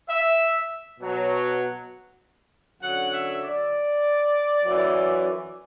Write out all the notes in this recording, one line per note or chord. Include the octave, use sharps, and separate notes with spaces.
E5
B2 F#3
F#2 D3 F#3 F#5
E5
D5
F#2 E3